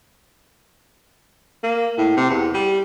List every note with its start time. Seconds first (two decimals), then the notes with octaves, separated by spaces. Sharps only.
1.63 A#3
1.98 A2
2.17 C3
2.30 E2
2.54 G3